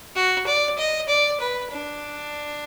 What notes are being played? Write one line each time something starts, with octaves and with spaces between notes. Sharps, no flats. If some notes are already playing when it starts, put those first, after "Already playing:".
F#4
D5
D#5
D5
B4
D4